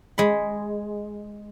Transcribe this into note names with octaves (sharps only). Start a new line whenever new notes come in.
G#3 B5